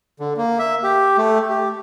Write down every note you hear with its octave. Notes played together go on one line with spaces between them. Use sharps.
D3
A#3
E5
G4
A3
G4